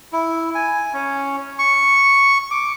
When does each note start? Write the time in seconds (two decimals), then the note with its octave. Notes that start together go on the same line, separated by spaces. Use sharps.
0.13 E4
0.55 G#5
0.94 C#4
1.59 C#6
2.51 D6